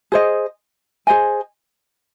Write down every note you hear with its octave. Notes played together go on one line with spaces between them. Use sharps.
G#4 C5 D#5
G#4 C5 D#5 G#5